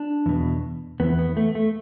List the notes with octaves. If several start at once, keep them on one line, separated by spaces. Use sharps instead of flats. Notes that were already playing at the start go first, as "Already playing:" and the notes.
Already playing: D4
E2 B2
E2 E3 B3
B3
A3
A3